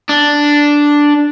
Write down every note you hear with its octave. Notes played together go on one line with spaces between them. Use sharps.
D4